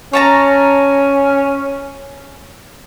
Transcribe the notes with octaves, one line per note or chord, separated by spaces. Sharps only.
C#4 C#5 A5 A#5